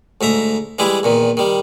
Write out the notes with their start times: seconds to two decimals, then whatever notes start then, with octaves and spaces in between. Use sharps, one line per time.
0.21 D2 G#2 E5 A#5
0.79 E3 G3 G#3 E4
1.03 E2 A#2 D#3
1.37 D#3 G3